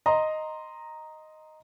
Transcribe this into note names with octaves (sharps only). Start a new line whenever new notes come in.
D#5 A#5 C6